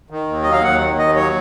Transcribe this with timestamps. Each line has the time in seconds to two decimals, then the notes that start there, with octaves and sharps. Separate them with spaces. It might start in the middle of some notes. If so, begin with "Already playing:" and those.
0.10 D#3
0.27 D#2
0.42 F#3 D#5
0.52 F5
0.63 D#2 F#5
0.80 D#3
0.98 D#2 D#5
1.16 F#3 C#5